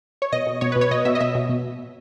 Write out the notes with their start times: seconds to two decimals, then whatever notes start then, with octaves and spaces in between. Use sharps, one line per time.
0.22 C#5
0.32 B2 D#5
0.47 B2
0.61 B2 C#5
0.72 B4
0.76 B2
0.81 C#5
0.91 B2 D#5
1.05 B2 E5
1.15 D#5
1.20 B2 E5
1.35 B2
1.49 B2